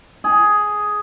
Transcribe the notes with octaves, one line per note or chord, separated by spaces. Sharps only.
G#4